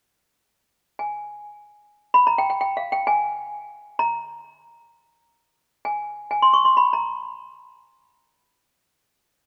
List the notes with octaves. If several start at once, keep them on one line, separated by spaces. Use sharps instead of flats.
G#5
B5
A#5
G5
G5
G5
F5
G5
G#5
A#5
G#5
G#5
C6
C#6
C6
B5
A#5